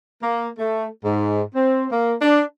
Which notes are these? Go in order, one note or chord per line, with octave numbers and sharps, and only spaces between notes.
A#3
A3
G#2
C4
A#3
D4